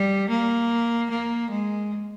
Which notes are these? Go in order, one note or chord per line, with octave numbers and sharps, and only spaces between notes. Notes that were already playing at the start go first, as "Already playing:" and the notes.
Already playing: G3
A#3
A#3
G#3